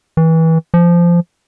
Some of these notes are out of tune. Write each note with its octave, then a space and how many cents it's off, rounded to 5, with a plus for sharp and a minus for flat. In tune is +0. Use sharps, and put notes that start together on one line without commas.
E3 -25
F3 -15